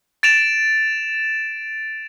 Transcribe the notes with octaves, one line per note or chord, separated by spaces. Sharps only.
A6 D7 E7 F7